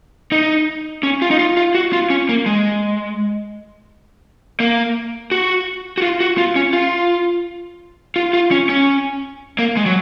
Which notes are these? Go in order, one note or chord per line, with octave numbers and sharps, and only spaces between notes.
D#4
C#4
F4
D#4
F4
F4
F#4
F4
C#4
A#3
G#3
A#3
F#4
F#4
F4
F#4
F4
C#4
F4
F4
F4
C#4
C#4
A#3
G#3
F#3